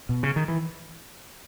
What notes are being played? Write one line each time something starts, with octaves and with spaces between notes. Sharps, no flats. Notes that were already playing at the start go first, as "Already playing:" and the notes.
B2
C#3
D#3
E3